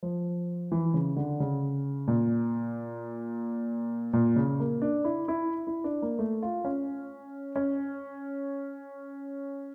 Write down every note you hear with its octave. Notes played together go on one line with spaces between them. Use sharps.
F3
E3
C#3
D3
C#3
A#2
A#2
C#3
A#3
D4
E4
E4
E4
D4
A#3
A3
F4
C#4
C#4